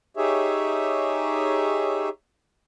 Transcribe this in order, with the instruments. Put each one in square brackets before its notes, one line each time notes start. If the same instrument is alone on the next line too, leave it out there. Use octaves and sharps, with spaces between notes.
[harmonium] D#4 G4 G#4 C#5 E5